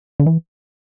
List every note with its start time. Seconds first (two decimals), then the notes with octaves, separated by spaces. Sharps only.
0.20 D3
0.26 E3